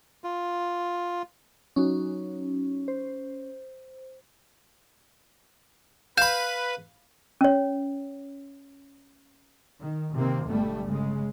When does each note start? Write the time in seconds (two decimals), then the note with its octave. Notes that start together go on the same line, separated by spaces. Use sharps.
0.24 F4
1.76 F#3 C#4 D#4 F#4
2.88 C5
6.18 B4 F5 B5 G6 E7
7.41 C#4 C#5
9.82 D#3
10.15 C3 D#3 A#3 C4
10.47 G1 B2 G3 A3
10.86 C#3 G#3